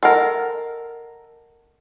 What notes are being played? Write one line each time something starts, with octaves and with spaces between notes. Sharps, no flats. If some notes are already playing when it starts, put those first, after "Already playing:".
A4 A#4 D#5 F#5 G#5